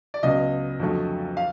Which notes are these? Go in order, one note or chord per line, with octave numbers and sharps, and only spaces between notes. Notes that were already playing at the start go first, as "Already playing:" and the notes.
D5
C#2 C#3 F#3 B3 D#5
F2 D3 F#3 A3
F5